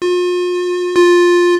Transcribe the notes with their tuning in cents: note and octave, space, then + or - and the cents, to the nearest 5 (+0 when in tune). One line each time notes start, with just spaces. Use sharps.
F4 +40
F4 +10